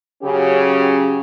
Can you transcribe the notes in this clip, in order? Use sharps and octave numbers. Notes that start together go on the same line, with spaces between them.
C#3 F#3 C#4 G4